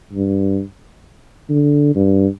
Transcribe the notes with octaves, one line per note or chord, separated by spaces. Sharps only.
G2
D3
G2